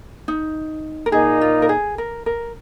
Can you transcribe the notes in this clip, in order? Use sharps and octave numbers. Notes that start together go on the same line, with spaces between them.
D#4
A#4
A#2 A#3 D#4 G#4
F4
A#4
G#4
A#4
A#4